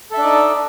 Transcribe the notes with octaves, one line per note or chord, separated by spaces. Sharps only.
D4 D#4 A4 D5 E5